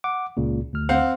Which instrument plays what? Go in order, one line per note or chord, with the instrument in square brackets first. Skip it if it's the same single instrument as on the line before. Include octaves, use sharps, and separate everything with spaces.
[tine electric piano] F#5 D6
C#2 A#2 C#3
D2 F6
[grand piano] C4 F5 F#5